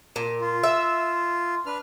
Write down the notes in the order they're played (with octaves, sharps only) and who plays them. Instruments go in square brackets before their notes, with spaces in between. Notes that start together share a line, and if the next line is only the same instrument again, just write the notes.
[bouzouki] A#2
[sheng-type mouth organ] F4
[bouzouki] E5
[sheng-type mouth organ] D4 B4 F6